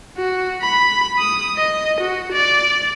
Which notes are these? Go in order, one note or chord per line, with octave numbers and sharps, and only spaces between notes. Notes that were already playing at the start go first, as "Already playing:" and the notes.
F#4
B5
D#6
D#5
F#4
D5